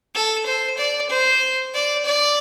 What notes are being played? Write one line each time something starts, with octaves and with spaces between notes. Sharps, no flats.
A4
C5
D5
C5
D5
D5